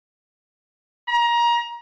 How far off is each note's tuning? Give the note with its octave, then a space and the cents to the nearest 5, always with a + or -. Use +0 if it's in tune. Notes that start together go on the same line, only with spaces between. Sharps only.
A#5 +25